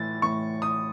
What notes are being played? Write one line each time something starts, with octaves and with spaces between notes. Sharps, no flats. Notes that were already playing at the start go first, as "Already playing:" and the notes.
Already playing: A2 E3 A6
A2 E3 C#6
D#6